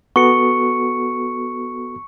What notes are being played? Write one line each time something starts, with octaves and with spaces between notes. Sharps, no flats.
B3 F#4 A4 C#6 C#7